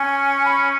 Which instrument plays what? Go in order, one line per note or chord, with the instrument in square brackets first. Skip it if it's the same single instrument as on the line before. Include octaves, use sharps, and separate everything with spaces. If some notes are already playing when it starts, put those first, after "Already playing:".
Already playing: [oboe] C#4 [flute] G#5
[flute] B5